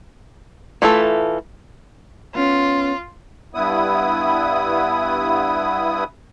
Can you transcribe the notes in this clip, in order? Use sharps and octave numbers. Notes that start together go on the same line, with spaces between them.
E3 A3 F4 A4
B3 C#4 F4
G2 B3 E4 D#6